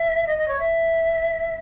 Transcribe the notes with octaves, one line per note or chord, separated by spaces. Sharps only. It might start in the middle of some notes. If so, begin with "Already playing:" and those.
Already playing: E5
D#5
D#5
C#5
E5